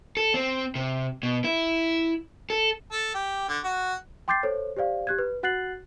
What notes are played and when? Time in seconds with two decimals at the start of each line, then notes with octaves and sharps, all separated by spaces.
0.17 A4
0.34 C4
0.75 C3
1.23 B2
1.44 E4
2.50 A4
2.92 A4
3.14 G4
3.48 D3
3.64 F#4
4.28 G5 C6 D6 G6 A6 C7
4.43 A4 C5 C#5
4.77 G4 C5 D5 F5
5.07 G4 F#6 G#6
5.19 B4
5.43 F#4 F#5 F#6 A6 C7 F#7